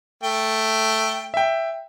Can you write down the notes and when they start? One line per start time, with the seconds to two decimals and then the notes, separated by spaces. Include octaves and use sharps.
0.23 A3 G5
1.34 E5 G5